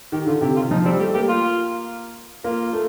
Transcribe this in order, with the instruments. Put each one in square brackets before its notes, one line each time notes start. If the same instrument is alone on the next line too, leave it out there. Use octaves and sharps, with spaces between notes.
[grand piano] D#3 [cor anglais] G4
[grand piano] D3 [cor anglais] F4
[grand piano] C3 [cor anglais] G4
[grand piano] D#3 [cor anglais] F4
[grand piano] F3 [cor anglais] D#4
[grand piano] G3 [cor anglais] C4
[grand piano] A3 [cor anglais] G4
[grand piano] A#3 [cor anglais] G4
[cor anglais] F4
[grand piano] A#3 [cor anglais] F4
[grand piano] A3